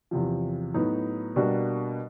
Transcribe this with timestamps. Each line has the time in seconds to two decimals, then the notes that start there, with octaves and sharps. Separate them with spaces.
0.11 E2 C3 F3
0.74 A2 F#3 B3 D#4
1.36 B2 G3 A#3 D4 F#4